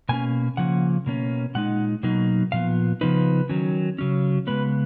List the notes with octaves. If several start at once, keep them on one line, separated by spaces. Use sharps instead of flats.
B2 A#3 C#4 G#5
C#3 F3 A#3 C#4 F#5
B2 A#3 C#4
A#2 G#3 D#4 F#5
B2 F#3 A#3 D#4
A#2 F3 B3 F5
C#3 F3 B3 D#4 B4
D#3 F#3 C#4
C#3 F#3 C#4
C#3 G#3 B3 B4